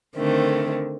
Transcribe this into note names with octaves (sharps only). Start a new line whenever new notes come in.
D3 D#3 A3 C4